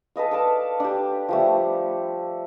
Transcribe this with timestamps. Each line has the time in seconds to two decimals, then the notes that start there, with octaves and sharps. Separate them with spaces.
0.16 A4 B4 D#5 F5
0.31 A4 D5 F5 A5
0.80 D4 G4
1.29 F3 G3 A3